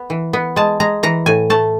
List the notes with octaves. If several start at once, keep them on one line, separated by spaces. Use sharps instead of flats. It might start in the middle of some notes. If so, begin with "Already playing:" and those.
Already playing: B3
E3
B3
G#3 A5
G#3 A#5
E3 A#5
A2 G#5
A3 A5